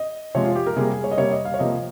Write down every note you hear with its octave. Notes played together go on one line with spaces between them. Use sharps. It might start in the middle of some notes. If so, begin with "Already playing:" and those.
Already playing: D#5
C3 F3 G#3 C#5
F4
G4
A#4
C3 G3 A#3 G#4
G#4
C#5
D#5
C3 G3 A#3 C#5
D#5
F5
C#5
C3 F3 A#3 D#5